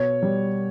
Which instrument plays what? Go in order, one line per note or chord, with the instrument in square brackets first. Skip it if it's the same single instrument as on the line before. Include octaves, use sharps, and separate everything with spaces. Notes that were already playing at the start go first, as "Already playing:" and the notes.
Already playing: [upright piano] B2 C#5
G3